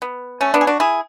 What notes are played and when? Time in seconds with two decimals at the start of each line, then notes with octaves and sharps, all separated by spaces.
0.02 B3
0.41 A3 C#4
0.54 B3 D4
0.61 G#4
0.67 D4 F#4
0.80 E4 G#4